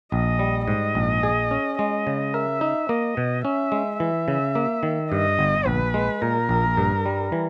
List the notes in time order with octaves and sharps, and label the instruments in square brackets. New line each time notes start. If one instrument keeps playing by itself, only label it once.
[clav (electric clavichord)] A#1 [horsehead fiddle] D#5
[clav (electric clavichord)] G3
[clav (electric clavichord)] G#2 [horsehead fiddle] D#5
[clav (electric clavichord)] A#1
G#4
C#4
[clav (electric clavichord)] G#3 [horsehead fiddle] D#5
[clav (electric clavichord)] C#3
[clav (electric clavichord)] A#4 [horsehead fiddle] E5
[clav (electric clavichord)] D#4
[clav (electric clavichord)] A#3 [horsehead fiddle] D#5
[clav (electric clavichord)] B2
[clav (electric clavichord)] C#4 [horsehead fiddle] E5
[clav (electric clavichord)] G#3
[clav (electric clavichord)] E3 [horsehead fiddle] E5
[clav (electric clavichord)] C#3
A#3
D#3
[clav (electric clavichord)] G2 [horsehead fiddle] D#5
[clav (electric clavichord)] G1
[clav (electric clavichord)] A#1 [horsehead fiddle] B4
[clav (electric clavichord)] G#3
[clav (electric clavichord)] A#2 [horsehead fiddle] A#4
[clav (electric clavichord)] A#1
G2
G3
E3